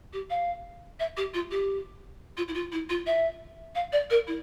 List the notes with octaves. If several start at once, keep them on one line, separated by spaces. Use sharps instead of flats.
G4
F5
E5
G4
F4
G4
F4
E4
F4
E4
F4
E5
F5
D5
A#4
E4